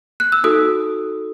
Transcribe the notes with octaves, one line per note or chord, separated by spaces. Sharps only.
F#6
E6
D#4 F#4 A4 D#6